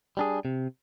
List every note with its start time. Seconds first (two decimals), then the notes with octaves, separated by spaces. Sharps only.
0.17 G3 D4 G#4
0.45 C3